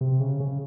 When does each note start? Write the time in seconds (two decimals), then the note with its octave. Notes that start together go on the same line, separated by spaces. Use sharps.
0.01 C3
0.20 C#3
0.40 C#3